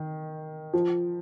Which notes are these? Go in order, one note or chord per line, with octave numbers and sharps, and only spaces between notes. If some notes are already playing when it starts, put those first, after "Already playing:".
Already playing: D#3
F3